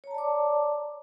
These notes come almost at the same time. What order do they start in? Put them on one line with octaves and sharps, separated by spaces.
C#5 A#5 A5 D5 D6